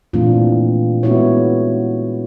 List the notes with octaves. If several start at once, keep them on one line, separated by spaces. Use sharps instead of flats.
A#2 E3 A3 C4 D4 F4
G#3 B3 C#4 E4 F#4 C#5